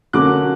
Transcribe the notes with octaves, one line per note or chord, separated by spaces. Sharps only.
D3 F#3 A#3 C#4 D6 F#6